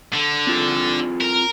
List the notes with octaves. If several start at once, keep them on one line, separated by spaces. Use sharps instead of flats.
D3
C4 F4 G#4
A#4